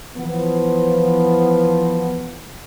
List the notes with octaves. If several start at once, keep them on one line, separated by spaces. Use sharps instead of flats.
E3 F3 B3